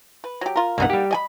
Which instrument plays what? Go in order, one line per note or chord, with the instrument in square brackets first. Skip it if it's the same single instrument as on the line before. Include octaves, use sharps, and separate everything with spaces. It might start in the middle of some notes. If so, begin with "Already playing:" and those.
[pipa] B4
F#3 G4
F4 A#4
[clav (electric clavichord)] C2 G2 B3 [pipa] A#3 D#4 F#5
[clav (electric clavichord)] G3 G4
[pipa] D#5 G#5 B5